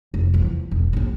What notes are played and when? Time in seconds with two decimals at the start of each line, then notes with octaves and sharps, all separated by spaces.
0.14 F1
0.34 E2 F3
0.71 E1
0.93 A#1 F3